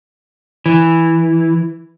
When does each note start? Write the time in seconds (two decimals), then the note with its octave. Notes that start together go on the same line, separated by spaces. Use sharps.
0.66 E3